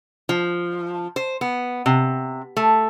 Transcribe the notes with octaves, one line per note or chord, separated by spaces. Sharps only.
F3
C5
B3
C3
A3